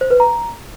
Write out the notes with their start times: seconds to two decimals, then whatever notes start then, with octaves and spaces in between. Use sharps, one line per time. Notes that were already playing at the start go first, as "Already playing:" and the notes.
0.01 C5
0.10 B4
0.20 A#5